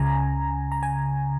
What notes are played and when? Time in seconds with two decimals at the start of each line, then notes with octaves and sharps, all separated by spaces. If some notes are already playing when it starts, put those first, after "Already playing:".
Already playing: C#2 C#3 G#5 A#5
0.72 A#5
0.83 G#5